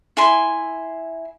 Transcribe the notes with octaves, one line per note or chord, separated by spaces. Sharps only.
E4 G#5 C6